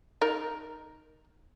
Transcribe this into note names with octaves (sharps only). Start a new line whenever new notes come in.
D#4 A#4